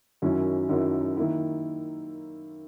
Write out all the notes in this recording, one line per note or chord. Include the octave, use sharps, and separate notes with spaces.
F#2 D#3 F#3 C#4 E4
F#2 D#3 F#3 C#4 E4
D#3 A#3 E4